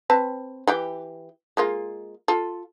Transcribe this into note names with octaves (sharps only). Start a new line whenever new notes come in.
C4 B4 A5
E3 G4 G5
G#3 A#3 F4
F4 A4